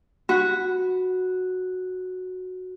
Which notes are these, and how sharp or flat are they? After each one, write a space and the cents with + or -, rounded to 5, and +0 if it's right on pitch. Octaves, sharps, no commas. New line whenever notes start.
F#4 -5 B5 +0